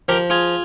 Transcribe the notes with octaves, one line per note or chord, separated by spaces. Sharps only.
F3 G4 A#4
F4 G#4